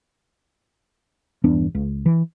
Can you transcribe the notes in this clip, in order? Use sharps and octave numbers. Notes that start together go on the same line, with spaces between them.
G1 E2 B3 D4
C#2
E3